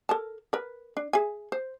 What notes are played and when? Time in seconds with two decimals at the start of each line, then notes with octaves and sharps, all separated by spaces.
0.09 A4 A#4 A5
0.53 A#4 B4
0.97 D4
1.13 G#4 E5 G#5
1.52 C5